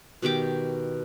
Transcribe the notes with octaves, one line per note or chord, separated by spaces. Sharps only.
B2 D#3 G4 D6